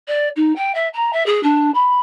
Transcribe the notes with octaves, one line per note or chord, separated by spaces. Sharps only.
D5
D#4
G5
E5
A#5
E5
G#4
D4
B5